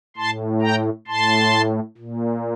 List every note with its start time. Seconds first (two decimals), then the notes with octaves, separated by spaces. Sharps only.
0.16 A2 A5 C6
0.61 G5 A#5
1.07 A2 A5 C6
1.98 A#2